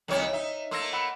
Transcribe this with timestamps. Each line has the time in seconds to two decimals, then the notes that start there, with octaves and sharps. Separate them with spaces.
0.08 C2 F2 D#3 C#5
0.33 D#4 E5
0.71 A3 A#3 C6 E6 A#6
0.93 F#5 B5 E6